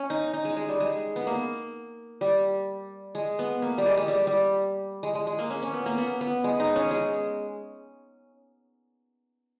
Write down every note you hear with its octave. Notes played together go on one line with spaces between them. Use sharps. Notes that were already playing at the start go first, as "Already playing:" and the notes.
Already playing: C#4
D#4
D#4
G#3
G#3
G3
G#3
B3
A#3
G3
G#3
B3
A#3
G3
G#3
G#3
G3
G3
G#3
G#3
G#3
A#3
C#4
C#4
B3
A#3
B3
B3
G#3
D#4
C#4
G#3